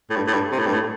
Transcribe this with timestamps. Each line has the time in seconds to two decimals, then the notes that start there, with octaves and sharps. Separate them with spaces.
0.10 A2
0.16 G2
0.27 A2
0.33 G2
0.51 C3
0.59 A2
0.66 G2
0.73 A2